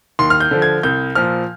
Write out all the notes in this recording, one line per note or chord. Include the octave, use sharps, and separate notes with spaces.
D#2 C6
F6
G6
D3 F3
G#6
C2 G6
A#2 F3 F6